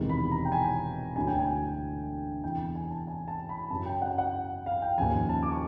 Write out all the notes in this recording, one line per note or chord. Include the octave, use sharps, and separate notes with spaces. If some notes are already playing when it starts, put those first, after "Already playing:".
Already playing: E1 E2 C3 D#3 G#3
B5
A#5
G5
G#5
D2 D3 F#3 G#5
G5
G#5
E2 C3 E3 G5
G#5
A5
G#5
A5
B5
F#2 C#3 F#3 A5
G5
F#5
F#5
F5
G5
D#2 C#3 F3 G#5
A5
D6
C#6